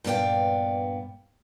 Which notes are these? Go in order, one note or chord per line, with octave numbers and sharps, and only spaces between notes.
G2 A#2 B3 D5 F5 G5